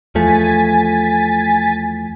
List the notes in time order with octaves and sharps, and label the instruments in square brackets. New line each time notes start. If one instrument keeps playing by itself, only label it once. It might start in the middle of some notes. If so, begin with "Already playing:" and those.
[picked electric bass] E2 F3 A3 [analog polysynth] G#5 A6 B6